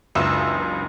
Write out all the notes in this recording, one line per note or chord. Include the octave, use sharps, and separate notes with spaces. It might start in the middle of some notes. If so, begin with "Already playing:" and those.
F#1 C#2 E3 D4 F4 E5 D#6 E6